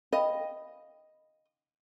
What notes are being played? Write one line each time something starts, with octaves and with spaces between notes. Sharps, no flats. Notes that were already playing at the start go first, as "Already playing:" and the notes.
D#5 F5 G5 B5